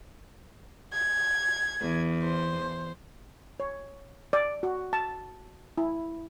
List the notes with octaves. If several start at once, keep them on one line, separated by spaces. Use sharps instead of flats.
G#6
E2
C5
C#5
D5
F#4
A5
E4